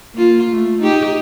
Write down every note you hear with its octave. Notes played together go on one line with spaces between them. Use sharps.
A#3 F4
A3
D#4 G4